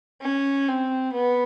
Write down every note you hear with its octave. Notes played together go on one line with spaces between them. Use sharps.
C#4
C4
B3